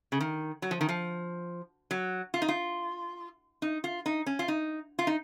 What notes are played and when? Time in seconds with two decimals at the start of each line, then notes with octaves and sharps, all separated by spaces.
0.12 C#3
0.21 D#3
0.62 F#3
0.71 F3
0.81 D#3
0.89 F3
1.91 F#3
2.34 F4
2.42 D#4
2.48 F4
3.62 D#4
3.84 F4
4.06 D#4
4.26 C#4
4.39 F4
4.48 D#4
4.99 F4
5.07 D#4